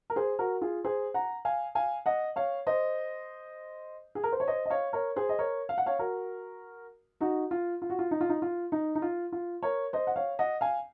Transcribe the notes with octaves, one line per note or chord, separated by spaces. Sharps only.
A#4
G#4 C5
F#4 A#4
F4 G#4
G#4 C5
F#5 A#5
F5 G#5
F5 G#5
D#5 F#5
C#5 F5
C5 D#5
G#4
A#4
C5
C#5
C5 D#5
D#5
C#5 F5
A#4 C#5
G#4 C5
D#5
A#4 C#5
F5
F#5
C#5 F5
F#4 A#4
D#4 F#4
F4
F4
F#4
F4
D#4
F4
D#4
F4
D#4
D#4
F4
F4
A#4 C#5
C5 D#5
F#5
C#5 F5
D#5 F#5
F5 G#5